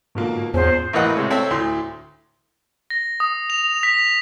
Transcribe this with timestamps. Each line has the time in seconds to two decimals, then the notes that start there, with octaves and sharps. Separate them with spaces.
0.15 G#2 B2 D3 A#3 F4
0.54 E2 C4 C#4 G#4 C5
0.93 A1 A2 A#3 B4 D#5 F#5
1.15 C3 G#3 C#4
1.30 C4 A4 C#5 E5
1.50 D2 A2 C6
2.90 A#6
3.20 D#6
3.50 F7
3.83 B6